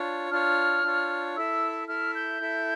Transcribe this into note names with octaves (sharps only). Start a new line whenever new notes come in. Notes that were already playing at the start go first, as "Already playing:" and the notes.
Already playing: D4 F4 C#5
D4 F4 C#5 F6
D4 F4 C#5
E4 A4 E5 E6
E4 A4 E5 F6
G6
E4 A4 E5